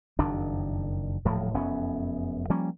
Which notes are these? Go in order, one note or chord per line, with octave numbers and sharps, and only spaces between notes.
F#1 F2 D#3 D4
D#1 A2 F3 F#3
F1 F#2 B3 C#4
F3 G3 A#3 C#4